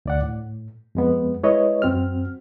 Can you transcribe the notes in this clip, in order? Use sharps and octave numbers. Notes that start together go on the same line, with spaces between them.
D2 D5 F#5
A2
F2 G#3 B3
G#3 E4 B4 C#5 D#5
F#2 C4 F#4 F6